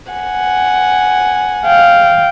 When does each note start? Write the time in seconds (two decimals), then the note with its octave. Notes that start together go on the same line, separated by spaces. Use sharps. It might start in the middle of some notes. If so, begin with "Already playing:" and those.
0.12 F#5 G#5
1.66 F5 G5